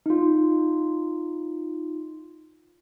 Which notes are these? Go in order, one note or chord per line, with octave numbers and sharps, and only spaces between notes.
D#4 F4